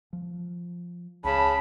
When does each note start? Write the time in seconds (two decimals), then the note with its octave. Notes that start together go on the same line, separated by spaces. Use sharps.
0.13 F3
1.24 C#2 C#3 A5 B5